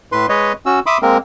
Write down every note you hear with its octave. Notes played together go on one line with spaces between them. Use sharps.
A2 B4 C6
G#3 B4 C#5 D#5
C#4 F#4 E6
E5 B5 C6 D6 D#6
G#3 A#3 C4 A#4